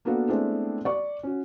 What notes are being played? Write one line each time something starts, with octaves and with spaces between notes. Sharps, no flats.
A#3 B3 D4 F#4 A4 F5
G#3 A3 B3 C4 D4 E4
D5 C#6
C#4 F#4